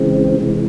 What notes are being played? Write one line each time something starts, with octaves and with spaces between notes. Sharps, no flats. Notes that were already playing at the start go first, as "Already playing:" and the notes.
Already playing: C#3 E3 G#3 C4
C3 E3 G#3